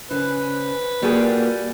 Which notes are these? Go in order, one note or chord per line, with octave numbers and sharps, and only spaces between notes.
C#3 B4 C5 G#5
G3 A#3 F4 F#4 G#4